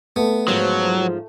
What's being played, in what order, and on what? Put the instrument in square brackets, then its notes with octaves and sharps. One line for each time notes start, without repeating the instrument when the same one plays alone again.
[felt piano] A3 [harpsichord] B3
[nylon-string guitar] G#2 F3 F4 [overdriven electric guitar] F#3